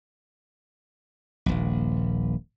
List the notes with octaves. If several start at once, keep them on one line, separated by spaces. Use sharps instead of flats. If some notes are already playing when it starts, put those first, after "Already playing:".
D#1 A#1